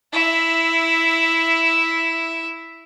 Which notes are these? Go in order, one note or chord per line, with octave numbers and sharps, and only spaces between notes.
E4 E5